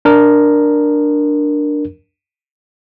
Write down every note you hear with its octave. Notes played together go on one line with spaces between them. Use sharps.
D4 A#4